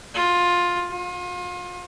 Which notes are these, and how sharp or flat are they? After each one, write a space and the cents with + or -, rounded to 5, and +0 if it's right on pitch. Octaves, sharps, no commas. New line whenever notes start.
F4 +15
F4 +35